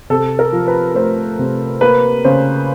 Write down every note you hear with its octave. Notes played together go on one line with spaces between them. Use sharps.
C3 A4
A#4
F3
B4
A3 C5
C3
A#3 B4
C#3 C5